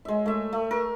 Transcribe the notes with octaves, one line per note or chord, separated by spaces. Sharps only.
G#3 E5
A3 E5
A3
A#4